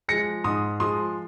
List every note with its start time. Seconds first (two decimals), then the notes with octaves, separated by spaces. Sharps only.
0.08 F3 G#3 A#6 C#7
0.44 G#2 C6 D#6
0.80 F3 G#3 C6 D#6